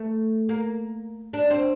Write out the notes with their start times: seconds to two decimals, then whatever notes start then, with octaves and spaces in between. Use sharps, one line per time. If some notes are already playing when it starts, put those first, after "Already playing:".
Already playing: A3
0.49 A#3
1.33 D4
1.50 C4